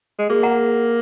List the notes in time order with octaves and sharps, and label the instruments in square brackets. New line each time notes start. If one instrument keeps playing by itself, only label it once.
[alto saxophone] G#3
[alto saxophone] A#3 [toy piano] G#4
[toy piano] F#5 A#5